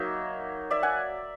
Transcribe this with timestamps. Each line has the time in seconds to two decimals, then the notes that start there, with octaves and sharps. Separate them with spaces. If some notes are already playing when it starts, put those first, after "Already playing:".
Already playing: F#3 A#3 D#4 E5
0.70 D5 E5
0.83 F#5 G#5